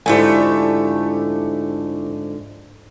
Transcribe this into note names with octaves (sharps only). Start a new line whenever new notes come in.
F2 G#2 D3 A3 E4 G4 G#5